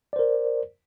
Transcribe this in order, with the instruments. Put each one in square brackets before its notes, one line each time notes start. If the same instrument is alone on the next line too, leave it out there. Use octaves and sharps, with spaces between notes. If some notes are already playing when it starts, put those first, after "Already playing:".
[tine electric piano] D5
C5
A#4